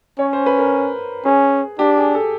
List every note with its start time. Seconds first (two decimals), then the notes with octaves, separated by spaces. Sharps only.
0.19 C#4 C#5
0.33 C5
0.46 B4
0.59 A#4
1.25 C#4 G#4
1.79 D4 G4
1.97 G#4
2.15 A4